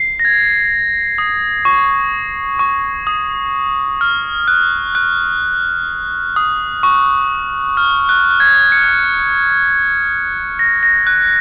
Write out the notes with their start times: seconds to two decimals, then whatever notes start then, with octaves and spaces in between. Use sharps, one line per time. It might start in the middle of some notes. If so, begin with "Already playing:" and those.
Already playing: C7
0.20 A#6
0.25 G#6
1.18 D#6
1.65 C#6
2.59 C#6
3.07 D#6
4.01 F6
4.48 F#6
4.95 F#6
6.36 D#6
6.83 C#6
7.77 F6
8.09 F#6
8.30 F#6
8.40 G#6
8.72 C#7
10.59 A#6
10.83 A#6
11.07 F#6